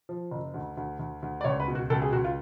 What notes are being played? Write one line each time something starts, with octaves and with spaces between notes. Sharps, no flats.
F3
F#1
D2
D2
D2
D2
D5
C#2 C#5
B4
B2
F#4
C#2 A4
G#4
C#2 F#4
F4